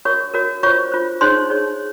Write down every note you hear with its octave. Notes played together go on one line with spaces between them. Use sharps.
F#4 A#4 C#5 C#6
F#4 A#4 C#5
F4 C5 C#5 C#6
F4 C5
D#4 G#4 C5 C#5 C6
D#4 G#4 C#5